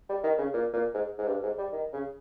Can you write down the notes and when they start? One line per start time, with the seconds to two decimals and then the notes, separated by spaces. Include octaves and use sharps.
0.09 G3
0.24 D#3
0.38 C#3
0.54 A#2
0.73 A#2
0.94 G#2
1.18 G#2
1.28 G2
1.43 G#2
1.58 G3
1.73 D#3
1.93 C#3